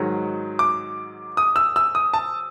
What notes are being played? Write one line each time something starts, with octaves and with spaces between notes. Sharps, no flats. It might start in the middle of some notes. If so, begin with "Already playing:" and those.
Already playing: G#2 D#3 F#3
D6
D#6
E6
E6
D#6
A5